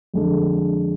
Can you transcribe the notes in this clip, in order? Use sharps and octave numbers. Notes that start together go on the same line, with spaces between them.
F2 D3 G#3 D4